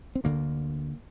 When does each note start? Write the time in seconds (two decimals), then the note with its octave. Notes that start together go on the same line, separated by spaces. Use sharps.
0.15 C4
0.24 D2 D3 A#3